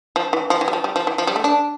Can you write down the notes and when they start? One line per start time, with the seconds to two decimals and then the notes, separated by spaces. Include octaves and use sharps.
0.16 F3
0.33 E3
0.50 F3
0.61 E3
0.68 G3
0.73 F3
0.84 G3
0.96 F3
1.07 E3
1.18 F3
1.27 G3
1.36 A3
1.44 D4